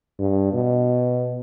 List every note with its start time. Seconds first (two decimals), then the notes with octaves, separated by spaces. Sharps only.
0.19 G2
0.53 B2